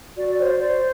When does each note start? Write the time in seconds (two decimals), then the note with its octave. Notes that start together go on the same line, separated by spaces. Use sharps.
0.17 F#4 D5
0.28 D5
0.38 C5 C#5
0.59 C5 D5